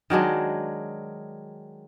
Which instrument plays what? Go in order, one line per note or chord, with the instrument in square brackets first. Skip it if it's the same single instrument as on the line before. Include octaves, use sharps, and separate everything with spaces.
[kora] D#3 F#3 G#3 D4